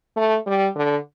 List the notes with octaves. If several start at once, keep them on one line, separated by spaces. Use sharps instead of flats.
A3
G3
D3